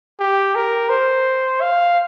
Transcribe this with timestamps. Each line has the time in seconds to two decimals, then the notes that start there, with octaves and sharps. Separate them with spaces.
0.20 G4
0.55 A#4
0.89 C5
1.61 F5